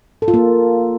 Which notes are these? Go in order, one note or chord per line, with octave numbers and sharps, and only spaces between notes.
A4
F4
A#3